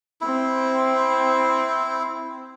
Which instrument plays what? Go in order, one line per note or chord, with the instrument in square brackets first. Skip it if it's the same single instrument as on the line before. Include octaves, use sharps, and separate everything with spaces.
[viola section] C4 [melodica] E4